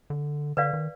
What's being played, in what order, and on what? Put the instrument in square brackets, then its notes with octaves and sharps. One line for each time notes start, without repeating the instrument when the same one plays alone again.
[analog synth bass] D3
[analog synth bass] D3 [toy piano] B4 D5 F5
[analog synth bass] D#3